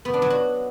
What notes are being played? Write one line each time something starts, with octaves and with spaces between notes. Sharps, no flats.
B3
D4
F#3
F#4